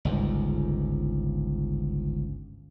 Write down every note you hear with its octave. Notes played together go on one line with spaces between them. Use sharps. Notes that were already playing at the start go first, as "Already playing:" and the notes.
G1 C#2 G#2